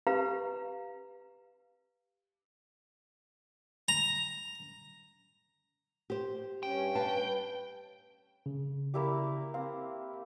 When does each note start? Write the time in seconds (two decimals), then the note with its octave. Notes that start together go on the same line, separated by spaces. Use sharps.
0.07 G4 B4 F5 A#5
3.88 A#5
6.10 G4 C5
6.63 G2 C#4 G5
6.95 B4 F5 A5
8.46 C#3
8.94 A#3 E4 G4
9.54 C4 F5